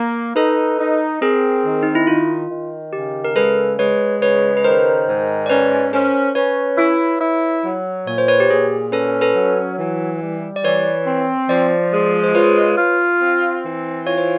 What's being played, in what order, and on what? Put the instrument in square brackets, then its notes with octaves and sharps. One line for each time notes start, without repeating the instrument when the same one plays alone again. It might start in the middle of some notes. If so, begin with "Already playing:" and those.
Already playing: [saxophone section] A#3
[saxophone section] D#4 [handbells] A4 B4
[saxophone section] D#4
[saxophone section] C4 [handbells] G#4 A#4
[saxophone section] D#3
[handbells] D#4
E4
[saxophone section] D#3 [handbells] F4
[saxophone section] D#3
[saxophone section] C#3 [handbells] G4
[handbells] A#4
[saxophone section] G#3 [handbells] A4 B4
[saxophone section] G#3 [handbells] B4 C#5
[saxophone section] C#3 [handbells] B4 C#5
[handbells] B4
[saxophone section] D#3 [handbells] A#4 C5
[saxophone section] G#2
[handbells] D5
[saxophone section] C#4 [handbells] B4 C#5
[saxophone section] C#4 [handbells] A#4 C5
[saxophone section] C#4 [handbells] B4 C#5
[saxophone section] E4
E4
F#3
[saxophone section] A#2 [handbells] C#5
[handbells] C5
B4 C#5
G4
[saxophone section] A#2 [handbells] G#4
[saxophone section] C#4 [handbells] A4 B4
[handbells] A4 B4
[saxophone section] F#3
E3
G3
[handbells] D5
[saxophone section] E3 [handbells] B4 C#5
[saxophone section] C4
[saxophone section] F3 [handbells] C5 D5
[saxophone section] G#3
[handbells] C5
[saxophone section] F4 [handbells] B4 C#5
[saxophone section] F4
C4
E3
[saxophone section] F4 [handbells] C#5
[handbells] C5